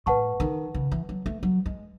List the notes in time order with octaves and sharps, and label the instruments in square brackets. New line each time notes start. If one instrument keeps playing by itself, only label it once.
[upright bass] A2 [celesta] B4 F#5 A5 C#6
[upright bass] D#3
C#3
E3
F#3
A3
F#3
G#3